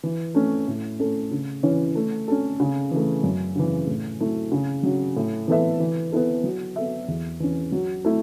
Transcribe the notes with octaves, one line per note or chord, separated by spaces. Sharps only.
E3
A3 C#4
A2
A3 C#4 A4
C#3
E3 C#4 E4 C#5
A3
C#4 A4
C#3
E3 A3
F#2
C#3 E3
A2
F#3 A3 E4
C#3
F#3 C#4
A2
E3 B3 A4 E5
E3
B3 E4 A4
F#3
B3 A4 E5
E2
E3 C#4
F#3
A3 E4